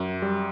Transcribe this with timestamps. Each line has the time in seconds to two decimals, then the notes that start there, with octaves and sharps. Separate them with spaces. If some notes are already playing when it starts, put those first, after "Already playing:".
Already playing: F#2
0.22 G3